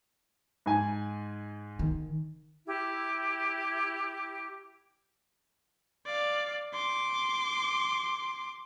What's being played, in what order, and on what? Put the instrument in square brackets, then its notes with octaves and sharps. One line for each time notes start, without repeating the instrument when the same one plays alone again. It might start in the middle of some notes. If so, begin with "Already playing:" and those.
[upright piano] G#2 G#5
[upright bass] D#3
[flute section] E4 G4
[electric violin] D5 F5
C6 D6